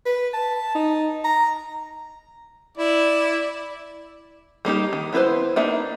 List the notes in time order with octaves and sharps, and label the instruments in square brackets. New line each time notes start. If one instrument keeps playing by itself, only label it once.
[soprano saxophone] B4
A5
D#4
A#5
[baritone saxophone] E4 [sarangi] D5
[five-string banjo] G3 A#3 D#4 G4
D#3
B3 E4 G#4 B4 C5
A#3 D4 D#4 E5